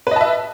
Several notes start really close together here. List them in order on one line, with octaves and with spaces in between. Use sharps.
B4 D#5 A5 E5